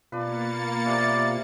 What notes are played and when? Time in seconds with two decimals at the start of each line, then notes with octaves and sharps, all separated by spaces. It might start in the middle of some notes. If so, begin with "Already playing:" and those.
0.12 B2 A#3 D4 F4 B4 A6 C#7
0.86 C3 E3 D5